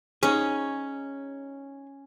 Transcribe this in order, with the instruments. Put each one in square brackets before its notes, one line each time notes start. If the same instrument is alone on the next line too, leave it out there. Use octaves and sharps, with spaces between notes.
[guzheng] C#4 [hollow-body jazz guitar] D#4 G#4